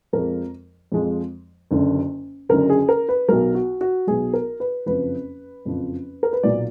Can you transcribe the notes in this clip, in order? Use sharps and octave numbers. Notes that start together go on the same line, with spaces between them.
F2 F3 G#3 A#4
F2 F3 G#3
F#1 F#2 D3
F#1 F#2 D3 A#4
G#4
A#4
B4
B1 B2 F#3 A#4
F#4
F#4
B1 B2 F#3 G#4
A#4
B4
F#1 F2 F3 B4
F#1 F2 F3
A#4
B4
B1 A#2 F#3 D5